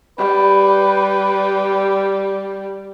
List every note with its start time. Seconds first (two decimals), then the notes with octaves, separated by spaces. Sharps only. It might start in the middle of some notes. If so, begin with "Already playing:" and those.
0.18 G3 B4